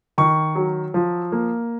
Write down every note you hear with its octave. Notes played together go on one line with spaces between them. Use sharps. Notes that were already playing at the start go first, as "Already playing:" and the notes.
D#3 C#6
F#3
F3
A#3